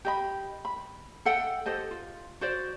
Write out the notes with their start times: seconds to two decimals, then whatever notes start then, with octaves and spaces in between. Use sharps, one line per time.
0.05 G4 D#5 B5
0.65 B5
1.25 A4 E5 F#5 G5
1.66 G4 A4 C5 D#5
1.91 F4
2.41 F#4 C5 D5